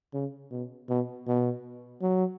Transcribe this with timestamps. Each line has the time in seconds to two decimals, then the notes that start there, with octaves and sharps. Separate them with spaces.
0.14 C#3
0.51 B2
0.89 B2
1.27 B2
2.02 F#3